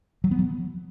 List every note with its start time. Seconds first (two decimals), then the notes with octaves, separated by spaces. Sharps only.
0.24 F#3
0.31 B3
0.39 F#3